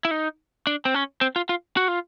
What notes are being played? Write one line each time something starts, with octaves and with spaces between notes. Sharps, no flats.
E4
D#4
D4
C4
C#4
C4
F4
F4
F#4
F4